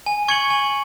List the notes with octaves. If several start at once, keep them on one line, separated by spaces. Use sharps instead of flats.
G#5
C#6 G#6 C#7 F#7
G#5